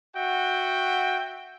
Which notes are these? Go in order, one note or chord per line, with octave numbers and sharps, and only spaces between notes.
F#4 E5 F#5 G5